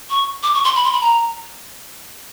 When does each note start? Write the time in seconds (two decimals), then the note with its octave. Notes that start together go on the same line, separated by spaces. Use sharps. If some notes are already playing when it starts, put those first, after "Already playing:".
0.10 C#6
0.43 D6
0.55 C#6
0.65 C6
0.76 B5
0.84 C6
0.93 B5
1.01 A#5